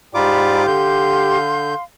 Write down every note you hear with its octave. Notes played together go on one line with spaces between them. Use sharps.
G#2 F4 G4 D5 A#5 B5 D6
D3 F5 C6 G6